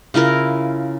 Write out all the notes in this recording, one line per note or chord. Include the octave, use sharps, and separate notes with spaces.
C#3 E4 F4 A#4